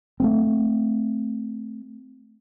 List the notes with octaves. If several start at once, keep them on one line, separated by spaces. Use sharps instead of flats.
A3 A#3 C4